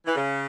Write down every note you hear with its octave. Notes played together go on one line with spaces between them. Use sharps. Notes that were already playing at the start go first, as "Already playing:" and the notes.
E3
C#3